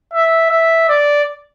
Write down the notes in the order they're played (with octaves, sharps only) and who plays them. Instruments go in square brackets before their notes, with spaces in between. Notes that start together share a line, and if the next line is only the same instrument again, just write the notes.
[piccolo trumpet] E5
E5
D5